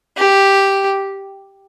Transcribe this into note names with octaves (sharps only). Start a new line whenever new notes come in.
G4